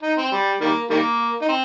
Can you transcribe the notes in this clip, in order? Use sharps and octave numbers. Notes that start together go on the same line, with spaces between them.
D#4
C4
G3
D#3 G3 A#3
D#3 G3 A#3
D#4
C4